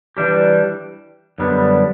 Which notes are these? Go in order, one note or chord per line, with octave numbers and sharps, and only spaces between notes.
E3 G3 D4 G4
F#2 D3 G3 B3 D4